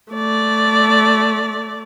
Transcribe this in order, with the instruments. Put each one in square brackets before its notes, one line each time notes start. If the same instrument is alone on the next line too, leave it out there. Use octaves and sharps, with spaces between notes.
[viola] A3 D5